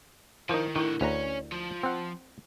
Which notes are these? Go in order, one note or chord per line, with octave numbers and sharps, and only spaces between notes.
D#3 F3 D#4 E4 A#4
A2 D3 D#3 E4 A#4
D2 C#4 B4 C#5 D5 A#5
F3
C4 F#5